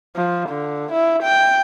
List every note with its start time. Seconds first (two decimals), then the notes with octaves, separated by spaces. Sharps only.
0.16 F3
0.49 D3
0.92 E4
1.23 G5